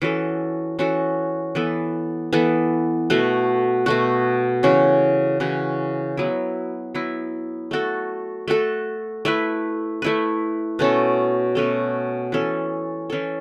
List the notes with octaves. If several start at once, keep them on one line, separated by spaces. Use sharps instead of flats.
E3 C#4 F#4 A4
E3 C#4 F#4 A4
E3 B3 A4
E3 B3 A4
B2 A3 F#4
B2 A3 F#4
C#3 E3 C#4 F#4
C#3 E3 C#4 F#4
F#3 B3 E4
F#3 B3 E4
A3 F#4 A4
A3 F#4 A4
A3 E4 B4
A3 E4 B4
B2 A3 C#4 A4
B2 A3 C#4 A4
E3 C#4 A4
E3 C#4 A4